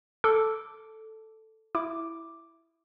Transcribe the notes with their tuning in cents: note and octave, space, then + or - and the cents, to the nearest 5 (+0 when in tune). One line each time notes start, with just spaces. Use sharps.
A4 +0 D6 -10
E4 +0 D6 +0